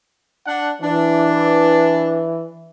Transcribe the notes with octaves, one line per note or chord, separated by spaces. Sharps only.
D4 F#5
E3 D4